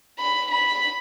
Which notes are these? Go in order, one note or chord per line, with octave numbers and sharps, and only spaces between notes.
B5
B5